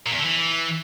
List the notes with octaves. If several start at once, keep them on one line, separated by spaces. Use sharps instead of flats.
A#2
E2
D3
E3